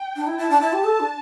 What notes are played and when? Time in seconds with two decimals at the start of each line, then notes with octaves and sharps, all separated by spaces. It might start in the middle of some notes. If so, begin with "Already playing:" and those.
Already playing: G5
0.16 D4
0.27 E4
0.38 E4 A5
0.50 D4
0.61 E4
0.73 G4
0.84 A4
1.00 D4